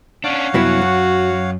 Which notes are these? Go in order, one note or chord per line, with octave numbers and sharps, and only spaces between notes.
C#4 D4 C#5 F5 F#5
C2 F#2 B3 E4 F#4
F#3